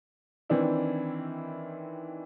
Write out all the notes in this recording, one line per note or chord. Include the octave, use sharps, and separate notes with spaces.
D#3 E3 C4 D4 E4